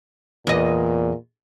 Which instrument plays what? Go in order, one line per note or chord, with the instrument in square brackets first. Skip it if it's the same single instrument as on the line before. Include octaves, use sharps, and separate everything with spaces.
[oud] E2 D#5 [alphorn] A#2